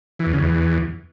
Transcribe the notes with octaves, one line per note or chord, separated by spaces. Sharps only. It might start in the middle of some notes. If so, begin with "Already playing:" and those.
E3
E2
C#3
E2